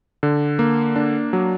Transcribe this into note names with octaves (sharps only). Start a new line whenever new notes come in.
D3
A#3
D4
F#3